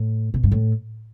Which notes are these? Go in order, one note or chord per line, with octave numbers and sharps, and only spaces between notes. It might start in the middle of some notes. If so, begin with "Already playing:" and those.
Already playing: A2
B2
G2
A2